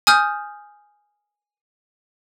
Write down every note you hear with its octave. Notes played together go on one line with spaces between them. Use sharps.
G#5 D#6 F6 G6